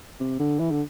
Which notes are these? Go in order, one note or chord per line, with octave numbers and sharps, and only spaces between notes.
C3
D3
E3
D3